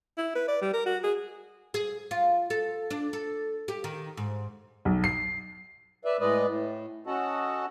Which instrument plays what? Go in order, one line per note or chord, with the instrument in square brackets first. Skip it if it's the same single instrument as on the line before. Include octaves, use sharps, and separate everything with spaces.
[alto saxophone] E4
B4
D5
G3
A#4
F#4
G#4
[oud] G#4
F4
A4
D4
A4
G4
D#3
G#2
[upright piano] B1
C7
[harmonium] B4 D5 E5
A2 G#3 B4 D5 D#5
A2
C#4 F#4 A4 D#5 F#5 A5